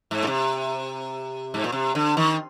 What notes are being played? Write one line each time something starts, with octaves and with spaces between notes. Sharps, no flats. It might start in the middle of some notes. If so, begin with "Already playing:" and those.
G#2
A#2
C3
G#2
A#2
C3
D3
D#3